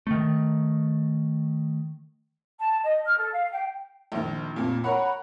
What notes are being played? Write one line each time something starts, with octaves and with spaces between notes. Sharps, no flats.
D#3 A3
A5
D#5
F6
A4
F5
G5
A#1 D#3
F2 A#2
A#4 C#5 F#5 B5